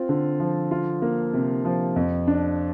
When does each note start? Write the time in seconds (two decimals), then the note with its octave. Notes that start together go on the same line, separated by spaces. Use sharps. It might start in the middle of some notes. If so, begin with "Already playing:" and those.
Already playing: C4 F4
0.09 D3
0.40 F3
0.71 F4
1.02 A#3
1.34 C3
1.65 F3
1.96 F2
2.27 D4